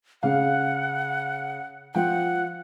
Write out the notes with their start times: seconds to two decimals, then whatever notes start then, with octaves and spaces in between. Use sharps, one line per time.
0.23 C#3 F5 F#5
1.95 F3 F#5 G5